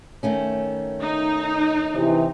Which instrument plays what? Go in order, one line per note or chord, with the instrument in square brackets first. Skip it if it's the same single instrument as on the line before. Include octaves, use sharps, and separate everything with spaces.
[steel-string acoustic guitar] D#3 A3 C#4
[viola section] D#4
[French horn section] C3 E3